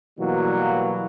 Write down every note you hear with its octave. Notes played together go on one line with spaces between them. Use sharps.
B2 E3 F#3 G3 A#3